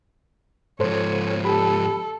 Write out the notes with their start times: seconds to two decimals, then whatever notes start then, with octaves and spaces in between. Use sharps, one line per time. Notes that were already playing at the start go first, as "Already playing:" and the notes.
0.80 G#2 F3 A4 C5 C#5
1.44 G4 A4 B5